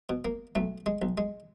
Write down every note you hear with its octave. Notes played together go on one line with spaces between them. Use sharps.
B2
A#3
B1 A3
G#3
B1
G#3